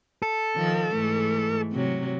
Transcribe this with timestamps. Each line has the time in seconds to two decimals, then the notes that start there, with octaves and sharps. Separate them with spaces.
0.22 A4
0.56 D#3 F3
0.94 G#2 E3 A3
1.72 C3 F#3